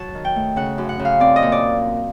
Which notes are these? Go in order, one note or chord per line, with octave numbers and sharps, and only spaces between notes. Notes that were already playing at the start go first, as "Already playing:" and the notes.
Already playing: F#3 A5
D#3
G5
A3
C#3 F#5
F#2
F#5
C#3
F5
C4 D5
D#5
A#2
D5